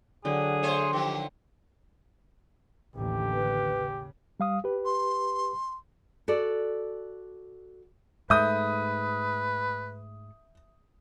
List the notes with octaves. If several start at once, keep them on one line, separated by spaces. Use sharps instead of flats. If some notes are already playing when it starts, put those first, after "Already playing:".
D3 F#3 G#4 G5
A3 C5 C#5 E5
D#3 F3 G4
A1 D#2 D3 G4
B4
C#3
G3 F5 D#6
G4 B4
C6
F#4 A4 D5
G#2 A3 B4 E5 D#6 G6